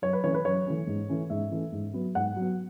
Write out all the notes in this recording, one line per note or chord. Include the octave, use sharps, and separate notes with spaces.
F#2 C#5
B4
E3 A3 C#4 C#5
B4
F#2 C#5
E3 A3 C#4
G#2
E3 A3 C#4
G#2 E5
E3 A3 C#4
G#2
F#3 B3
G#2 F#5
F#3 B3